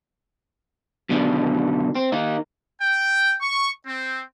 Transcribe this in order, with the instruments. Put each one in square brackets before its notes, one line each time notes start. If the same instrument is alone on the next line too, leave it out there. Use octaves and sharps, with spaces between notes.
[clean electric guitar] F#2 B2 D3 D#3
C4
D#3 A#3 D#4
[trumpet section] G5
C#6
C4